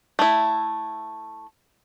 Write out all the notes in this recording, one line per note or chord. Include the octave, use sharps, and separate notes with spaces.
A3 E4